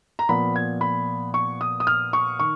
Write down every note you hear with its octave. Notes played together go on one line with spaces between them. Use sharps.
A#5
A#2 F3 B3 B5
G#6
B5
C#6
D#6
D#6
F6
C#6
D#3 C#6